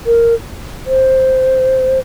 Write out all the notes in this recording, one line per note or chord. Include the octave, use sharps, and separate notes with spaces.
A#4
C5